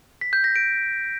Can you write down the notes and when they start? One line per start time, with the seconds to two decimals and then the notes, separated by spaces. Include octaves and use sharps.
0.21 B6
0.33 G6
0.44 A#6
0.56 D7